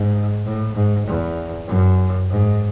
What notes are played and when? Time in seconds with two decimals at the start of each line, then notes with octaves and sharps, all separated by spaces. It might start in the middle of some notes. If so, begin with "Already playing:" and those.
Already playing: G#2
0.45 A2
0.75 G#2
1.07 E2
1.68 F#2
2.30 G#2